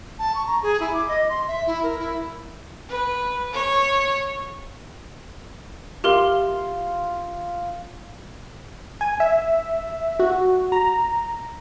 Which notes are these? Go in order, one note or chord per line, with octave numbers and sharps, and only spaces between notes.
A5
C#6
A#5
G#4
E4
D6
D#5
C6
E5
E4
A#4
E4
B4
C#5
F4 G4 A#4 F5 C6
G#5
E5
F#4
A#5